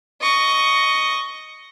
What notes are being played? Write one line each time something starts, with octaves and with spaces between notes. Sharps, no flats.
D#5 C#6